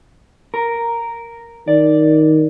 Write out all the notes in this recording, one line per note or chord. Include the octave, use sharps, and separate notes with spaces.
A#4
D#3 D5